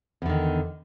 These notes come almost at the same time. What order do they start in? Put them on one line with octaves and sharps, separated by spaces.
E2 D3 D#3